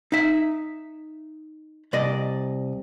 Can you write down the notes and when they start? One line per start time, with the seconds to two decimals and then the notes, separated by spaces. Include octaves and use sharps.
0.12 D#4 E5
1.93 C2 D5 D#5